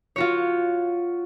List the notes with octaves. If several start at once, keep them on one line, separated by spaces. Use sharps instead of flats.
F4 F#4 C#5